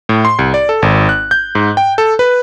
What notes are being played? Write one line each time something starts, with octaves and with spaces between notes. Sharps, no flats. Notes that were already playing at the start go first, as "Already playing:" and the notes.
A2
C6
C2
D5
A4
G#1
F#6
G6
G#2
G5
A4
B4